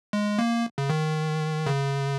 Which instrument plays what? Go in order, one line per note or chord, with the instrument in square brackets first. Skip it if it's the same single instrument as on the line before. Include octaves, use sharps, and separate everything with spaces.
[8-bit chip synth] G#3
A#3
C#3
D#3
C#3